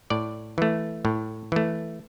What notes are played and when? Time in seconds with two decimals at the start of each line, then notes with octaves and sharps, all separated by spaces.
0.10 A2 D5
0.58 E3 A3
1.05 A2
1.52 E3 A3